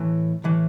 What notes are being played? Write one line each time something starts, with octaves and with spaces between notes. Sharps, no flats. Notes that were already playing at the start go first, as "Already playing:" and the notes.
Already playing: A2 E3
A2 E3